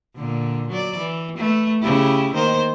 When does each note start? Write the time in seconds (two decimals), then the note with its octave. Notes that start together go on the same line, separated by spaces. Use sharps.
0.16 A#2 D3
0.69 F#3 D5
0.98 E3
1.38 A3 B4
1.80 C#3 E4 G4
2.34 D#3 A#3 C5